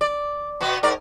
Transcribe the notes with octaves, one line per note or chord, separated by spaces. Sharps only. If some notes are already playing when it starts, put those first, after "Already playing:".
D5
B2 B3 F#4
G#2 A#4 D5